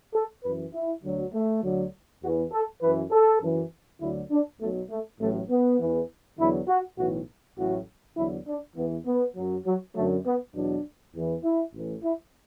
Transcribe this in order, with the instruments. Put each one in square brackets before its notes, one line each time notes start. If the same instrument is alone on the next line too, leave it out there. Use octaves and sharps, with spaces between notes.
[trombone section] A4
F#2 E3 B4
E4
D2 D3 F#3
A3
D2 D3 F#3
E2 F#4
E3
A4
F#2 E3 B4
A4
F#2 E3
D2 D3 F#3 E4
D4
B1 B2 F#3 A3
A3
A1 A2 F#3 A3
B3
E2 E3
E2 D3 F#3 E4
F#4
B1 A2 E3 F#4
A1 A2 F#3 F#4
E2 D3 F#3 E4
D4
E2 E3 B3
B3
F#2 F#3
F#3
F#2 D3 F#3 A3
B3
E2 B2 F#3 D4
E2 E3
E4
A1 A2 E3
E4